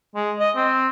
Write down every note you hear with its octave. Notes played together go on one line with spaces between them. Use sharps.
G#3
D#5
C4